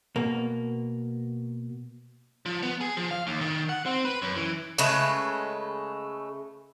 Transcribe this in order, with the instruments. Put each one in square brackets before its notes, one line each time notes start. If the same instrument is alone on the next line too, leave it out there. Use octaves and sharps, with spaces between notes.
[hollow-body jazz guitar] B2 A#3
[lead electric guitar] F3
B3
G#4
F3
F5
D#2
D#3
F#5
C4
B4
F#2
E3
[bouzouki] C#3 G#3 A3 B4